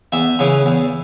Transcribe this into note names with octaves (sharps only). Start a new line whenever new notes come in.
E2 E5
C#3 E3
E2